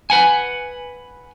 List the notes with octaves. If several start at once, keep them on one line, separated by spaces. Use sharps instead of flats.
B4 F#5 G#5